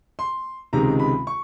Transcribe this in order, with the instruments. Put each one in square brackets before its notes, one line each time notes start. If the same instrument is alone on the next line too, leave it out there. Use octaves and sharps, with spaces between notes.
[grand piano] C6
C#2 C3 D#3 G#3 A#5
B5
C#6